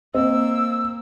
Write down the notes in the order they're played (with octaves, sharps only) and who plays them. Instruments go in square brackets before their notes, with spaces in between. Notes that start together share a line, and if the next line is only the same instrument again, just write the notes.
[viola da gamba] A#3 [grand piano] C4 D#5 [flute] E6